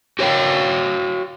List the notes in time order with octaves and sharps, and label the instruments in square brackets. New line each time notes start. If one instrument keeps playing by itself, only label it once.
[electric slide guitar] F#4 G4 C#5 D5 F5 G5